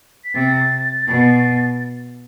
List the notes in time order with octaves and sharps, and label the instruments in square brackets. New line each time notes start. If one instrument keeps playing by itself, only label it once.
[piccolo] B6
[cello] C3 [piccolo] A6
[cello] B2